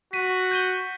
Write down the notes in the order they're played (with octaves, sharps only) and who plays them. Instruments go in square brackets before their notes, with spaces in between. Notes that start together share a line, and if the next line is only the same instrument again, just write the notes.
[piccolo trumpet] F#4 [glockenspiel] B6 D#7
[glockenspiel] G6 D#7 G7